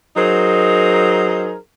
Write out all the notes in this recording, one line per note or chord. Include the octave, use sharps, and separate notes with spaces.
F#3 D#4 G#4 A#4 C5